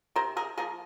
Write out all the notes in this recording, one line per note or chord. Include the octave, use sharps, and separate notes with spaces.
C3 A#4 C5
G#4 A#4
F3 A#3 G#4 A#4